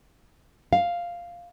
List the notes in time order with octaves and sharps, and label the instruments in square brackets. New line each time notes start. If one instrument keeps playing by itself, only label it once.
[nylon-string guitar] F5